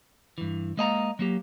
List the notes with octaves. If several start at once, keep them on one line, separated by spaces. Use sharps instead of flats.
G2 E3
G#3 A#3 D#5 F5 A5 A#5
F#3 A#3 G4